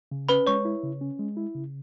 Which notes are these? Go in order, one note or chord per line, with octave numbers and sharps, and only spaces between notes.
C#3
C#4 B4 B5
G#3 C#5 C#6
E4
C#3
C#4
G#3
E4
C#3